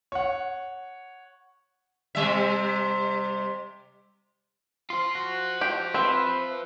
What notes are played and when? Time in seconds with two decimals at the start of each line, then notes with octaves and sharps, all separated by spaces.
0.12 C#5 F#5
2.15 C3 G3 E5
4.90 F4 C5 C6
5.15 F#4
5.61 G4
5.94 C4 B4 E5